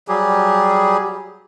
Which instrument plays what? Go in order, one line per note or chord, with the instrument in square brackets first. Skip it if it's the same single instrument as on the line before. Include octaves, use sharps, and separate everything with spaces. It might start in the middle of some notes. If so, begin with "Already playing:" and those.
[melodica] F#3 G3 G4 G#4